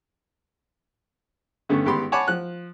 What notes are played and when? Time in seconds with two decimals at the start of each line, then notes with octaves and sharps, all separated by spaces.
1.69 G2 D3 A3 B3 C#4
1.85 G#1 B3 G4 G5 B5 C6
2.12 C#5 F#5 G#5 A5 B5 D6
2.28 F3 F#6